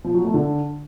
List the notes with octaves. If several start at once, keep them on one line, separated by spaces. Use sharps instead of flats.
F3
F#3
A3
D3